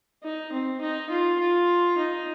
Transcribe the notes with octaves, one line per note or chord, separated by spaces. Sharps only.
D#4
C4
D#4
F4
F4
D#4